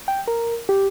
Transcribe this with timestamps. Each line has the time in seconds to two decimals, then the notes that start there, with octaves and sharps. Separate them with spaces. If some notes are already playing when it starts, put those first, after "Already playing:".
0.08 G5
0.28 A#4
0.69 G4